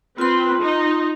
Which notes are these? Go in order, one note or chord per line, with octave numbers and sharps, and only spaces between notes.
C4 F4 B4 C6
D#4